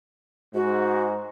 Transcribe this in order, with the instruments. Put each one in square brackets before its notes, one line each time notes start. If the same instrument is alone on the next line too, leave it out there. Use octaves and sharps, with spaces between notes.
[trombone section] G#2 [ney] F#4